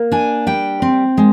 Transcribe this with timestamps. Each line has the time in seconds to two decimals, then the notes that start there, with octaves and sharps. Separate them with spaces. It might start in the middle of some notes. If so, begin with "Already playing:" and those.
Already playing: A#3
0.11 D4 G#5
0.47 G3 G5
0.82 C4
1.17 G#3